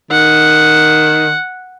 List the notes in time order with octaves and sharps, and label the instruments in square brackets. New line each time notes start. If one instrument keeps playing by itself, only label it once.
[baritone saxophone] D#3 [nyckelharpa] F#5